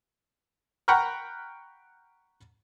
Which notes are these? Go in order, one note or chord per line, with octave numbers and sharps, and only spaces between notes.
F#5 G5 A#5 B5 C#6 F6